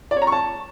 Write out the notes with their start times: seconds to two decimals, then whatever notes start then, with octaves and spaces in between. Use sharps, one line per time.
0.11 D5
0.16 C#5
0.22 A#5
0.27 C#6
0.32 A5